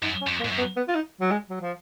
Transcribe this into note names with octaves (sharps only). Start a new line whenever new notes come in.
F#2 D#4
C#4
F2
A#3
G#2
F#2
B3
B3
F4
D#4
F#3
G#3
F#3
F3